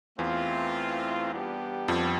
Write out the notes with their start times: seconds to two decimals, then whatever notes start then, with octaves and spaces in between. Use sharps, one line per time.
0.18 E2 E3 A3 C4 F4
1.32 G3 B3 D4 G4
1.88 F2 F3